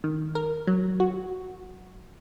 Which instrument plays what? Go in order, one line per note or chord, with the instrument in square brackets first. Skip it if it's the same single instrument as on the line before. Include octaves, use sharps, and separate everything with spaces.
[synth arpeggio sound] D#3
A#4
F#3
F#4